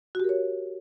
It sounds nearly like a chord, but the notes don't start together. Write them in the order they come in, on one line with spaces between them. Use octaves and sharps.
F#4 G4 A#4 C#5